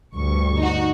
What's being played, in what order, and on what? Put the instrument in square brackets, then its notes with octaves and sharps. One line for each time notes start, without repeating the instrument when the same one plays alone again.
[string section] D2 G2 C#6
[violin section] D#4 F#4